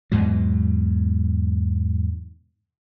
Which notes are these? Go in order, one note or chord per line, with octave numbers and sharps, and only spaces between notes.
E2 G#2 B2 F#3